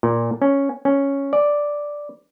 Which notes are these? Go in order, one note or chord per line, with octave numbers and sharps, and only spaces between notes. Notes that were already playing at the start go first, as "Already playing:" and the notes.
A#2
C#4
C#4
D5